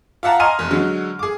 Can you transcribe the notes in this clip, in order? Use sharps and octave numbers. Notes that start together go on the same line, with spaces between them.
F4 E5 F#5 A5 A#5
D#5 G#5 A#5 C6 F6 D#7
F1
D3 F#3 G#3
G#4 D6